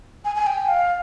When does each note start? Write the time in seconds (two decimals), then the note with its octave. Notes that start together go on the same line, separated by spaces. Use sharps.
0.25 G#5
0.36 G#5
0.46 G5
0.68 F5